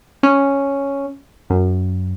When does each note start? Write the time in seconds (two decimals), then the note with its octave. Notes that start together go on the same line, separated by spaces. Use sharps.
0.23 C#4
1.50 F#2